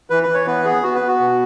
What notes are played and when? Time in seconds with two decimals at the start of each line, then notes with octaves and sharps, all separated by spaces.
0.10 E3 B4
0.23 B4
0.29 E3
0.34 C#5
0.47 B3 B4
0.65 B3 G#4
0.83 B3 F#4
0.95 B4
1.01 B3
1.08 F#4
1.20 B2